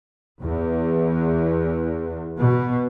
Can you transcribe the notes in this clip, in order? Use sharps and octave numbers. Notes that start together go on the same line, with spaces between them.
E2
B2